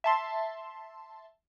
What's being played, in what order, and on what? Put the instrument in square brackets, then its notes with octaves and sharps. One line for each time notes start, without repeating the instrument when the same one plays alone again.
[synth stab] E5 A5 C6